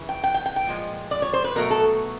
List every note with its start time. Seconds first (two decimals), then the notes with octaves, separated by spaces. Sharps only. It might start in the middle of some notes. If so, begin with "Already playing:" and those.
Already playing: C#3 E3
0.09 G5
0.24 G5
0.34 G5
0.46 G5
0.56 G5
0.67 A#2 F3 G#3
1.11 D5
1.22 C#5
1.33 C5
1.44 B4
1.56 B2 F#3 A3 A#4
1.70 A4